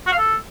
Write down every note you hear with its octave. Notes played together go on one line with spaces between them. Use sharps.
F#4
F5
A4